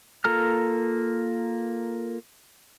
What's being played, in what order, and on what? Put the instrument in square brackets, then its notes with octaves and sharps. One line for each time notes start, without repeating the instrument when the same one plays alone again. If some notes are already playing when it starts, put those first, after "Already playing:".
[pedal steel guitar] A#3 F4 A4 A#5 F6